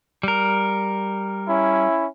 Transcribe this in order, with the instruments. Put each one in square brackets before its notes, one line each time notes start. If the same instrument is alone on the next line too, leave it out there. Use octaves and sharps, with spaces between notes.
[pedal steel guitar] G3 A#4
[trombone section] C#4 E4